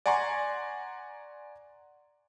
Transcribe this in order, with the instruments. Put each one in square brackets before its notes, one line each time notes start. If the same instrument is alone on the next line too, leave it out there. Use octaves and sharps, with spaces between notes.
[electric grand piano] D5 F#5 G#5 A#5 C6 C#6